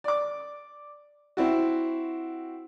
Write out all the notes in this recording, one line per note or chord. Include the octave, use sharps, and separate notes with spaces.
D5 D6
C4 E4 F#4